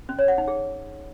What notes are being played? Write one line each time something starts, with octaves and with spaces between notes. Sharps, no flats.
C#4
C#5
F#5
D#4
G#4